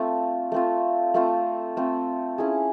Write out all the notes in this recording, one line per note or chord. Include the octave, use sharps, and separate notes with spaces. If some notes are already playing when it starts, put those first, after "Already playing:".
Already playing: A3 C4 F4
A3 C4 F4
A3 C4 F4
A3 C4 F4
C#4 E4 G#4